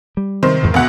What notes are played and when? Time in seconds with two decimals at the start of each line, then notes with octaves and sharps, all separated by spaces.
0.17 G3
0.43 C3 D#3 C5
0.63 E2 G#2 E3
0.74 D2 B2 F#5